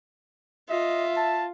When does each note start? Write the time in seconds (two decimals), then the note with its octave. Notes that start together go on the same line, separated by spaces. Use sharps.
0.70 F4 D#5 E5
1.17 A5